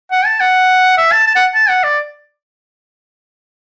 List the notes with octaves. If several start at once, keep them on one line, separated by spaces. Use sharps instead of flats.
F#5
A5
F#5
E5
A5
A5
F#5
A5
F#5
D5